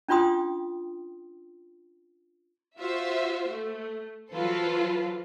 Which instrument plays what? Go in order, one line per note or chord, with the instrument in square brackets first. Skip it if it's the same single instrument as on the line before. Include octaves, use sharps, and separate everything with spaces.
[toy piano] C#4 D4 F4 G5 C6 D#6
[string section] F4 F#4 C5 E5
A3
E3 F#3 F4 A4 B4 C5